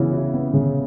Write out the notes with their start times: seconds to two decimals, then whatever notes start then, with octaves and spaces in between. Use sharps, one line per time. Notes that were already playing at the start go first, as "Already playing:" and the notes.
Already playing: C#3 E3 B3
0.13 E4
0.34 B3
0.53 C#3